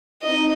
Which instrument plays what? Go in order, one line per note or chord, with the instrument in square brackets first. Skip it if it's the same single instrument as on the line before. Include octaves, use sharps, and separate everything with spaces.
[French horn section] C4 D#4 [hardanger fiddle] D#5